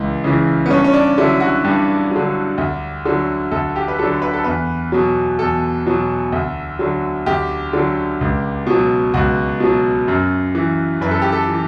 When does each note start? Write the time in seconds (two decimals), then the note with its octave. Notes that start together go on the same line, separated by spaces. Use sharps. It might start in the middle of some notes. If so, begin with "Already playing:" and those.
Already playing: C#2 E3
0.24 C#3 E3
0.66 B3
0.70 G2 C#4
0.84 C#4
0.94 D4
1.18 D3 F#3 E4
1.40 F#4
1.64 G2 G4
2.11 D3 F#3
2.58 D2
3.05 D3 F#3
3.51 D2 A4
3.76 G4
3.88 B4
3.99 D3 F#3 A4
4.22 B4
4.33 A4
4.44 E2 B4
4.92 B2 F#3
5.39 E2 A4
5.86 B2 F#3
6.32 D2
6.79 D3 F#3
7.26 D2 G4
7.73 D3 F#3
8.21 C#2
8.66 B2 F#3
9.14 C#2 F#4
9.60 B2 F#3
10.08 F#2
10.55 E3
11.01 F#2 B4
11.11 A4
11.22 G4
11.32 A4
11.48 E3